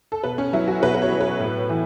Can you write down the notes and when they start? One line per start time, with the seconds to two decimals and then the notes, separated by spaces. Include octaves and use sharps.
0.12 A4
0.24 B2 B4
0.38 C#4
0.53 F#3 E4
0.68 F#4
0.82 B2 B4
0.95 B4
1.02 C#5
1.12 F#3
1.21 B4
1.40 A2
1.69 E3